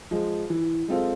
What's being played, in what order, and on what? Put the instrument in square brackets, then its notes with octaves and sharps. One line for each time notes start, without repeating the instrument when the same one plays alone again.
[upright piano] F3 G#3
E3
G#3 C4 F4 A4